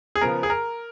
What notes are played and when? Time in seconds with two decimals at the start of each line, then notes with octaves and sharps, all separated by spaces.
0.15 G#4
0.21 C#3 F3 B3 A#4
0.43 G#4
0.50 A#4